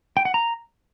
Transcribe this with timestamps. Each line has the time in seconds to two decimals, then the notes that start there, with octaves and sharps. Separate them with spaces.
0.17 G5
0.25 F#5
0.34 A#5